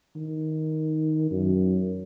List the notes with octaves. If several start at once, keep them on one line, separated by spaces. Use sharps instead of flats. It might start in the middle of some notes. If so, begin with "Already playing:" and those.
D#3
F#2